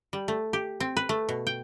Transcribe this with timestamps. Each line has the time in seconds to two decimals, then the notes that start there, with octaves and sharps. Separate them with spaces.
0.13 G3
0.28 A3
0.53 G4
0.80 C4
0.97 B4
1.09 A3
1.29 B2
1.47 G5